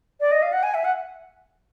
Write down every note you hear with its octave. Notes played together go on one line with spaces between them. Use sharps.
D5
D#5
F5
F#5
G#5
E5
F#5